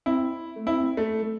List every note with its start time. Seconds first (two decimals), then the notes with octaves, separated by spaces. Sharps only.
0.06 C4 E4
0.56 A3
0.67 C4 E4
0.97 A3
1.23 A3